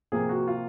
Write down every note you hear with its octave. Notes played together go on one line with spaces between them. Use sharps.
C3 F3 A#3 G#4
F#4
F4